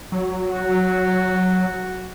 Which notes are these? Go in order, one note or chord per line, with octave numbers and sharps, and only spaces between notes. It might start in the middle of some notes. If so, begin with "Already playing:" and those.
F#3
F#4